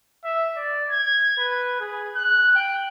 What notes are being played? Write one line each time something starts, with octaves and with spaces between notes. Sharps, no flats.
E5
D5
G#6
B4
G#4
F#6
G5